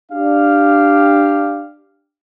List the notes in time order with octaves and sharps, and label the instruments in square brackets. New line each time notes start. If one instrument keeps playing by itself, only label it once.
[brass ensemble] D4 G4 F5